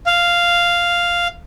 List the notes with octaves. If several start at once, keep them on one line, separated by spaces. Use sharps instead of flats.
F5